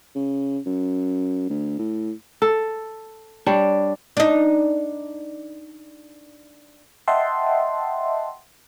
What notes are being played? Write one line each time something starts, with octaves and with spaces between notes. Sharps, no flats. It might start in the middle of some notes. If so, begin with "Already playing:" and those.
C#3
F#2
D2
A2
A4
G3 D4 C#5
D4 D#4
D#5 E5 F#5 G5 A5 C6